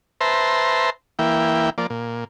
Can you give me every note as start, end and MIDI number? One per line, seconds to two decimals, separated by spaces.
0.21 0.90 71
0.21 0.90 72
0.21 0.90 76
0.21 0.90 81
0.21 0.90 82
0.21 0.90 84
1.19 1.70 52
1.19 1.70 58
1.19 1.70 64
1.19 1.70 79
1.78 1.87 53
1.78 1.87 58
1.78 1.87 74
1.90 2.24 46